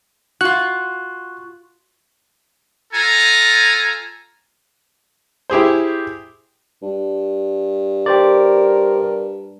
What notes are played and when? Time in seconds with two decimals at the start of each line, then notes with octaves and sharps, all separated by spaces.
0.41 F4 F#4 F#6
2.93 F4 A4 G#5 A#5
5.50 E4 G4 G#4 C5
6.82 G2
8.06 G4 A#4 C5 D5